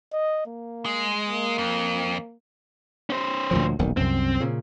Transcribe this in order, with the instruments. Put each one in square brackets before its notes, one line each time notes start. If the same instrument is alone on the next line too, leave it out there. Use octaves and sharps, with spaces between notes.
[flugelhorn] D#5
A#3
[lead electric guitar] G#3
[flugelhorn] A#3
[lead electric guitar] F2
C#4 C5
[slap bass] D2 A#2 F3
D#1 B1 D#3
[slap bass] C2 F#2 [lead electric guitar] C4
[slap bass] A#2 C#3